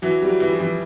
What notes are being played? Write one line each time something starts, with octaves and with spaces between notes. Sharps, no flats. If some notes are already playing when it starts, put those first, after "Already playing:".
E3 F#3
G3
F#3
E3
F3
E3